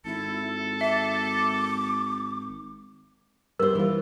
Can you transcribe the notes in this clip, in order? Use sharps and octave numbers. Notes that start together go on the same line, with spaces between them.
G#1 E4 A4
E5 D6
G3 A#4 C5
E3 F4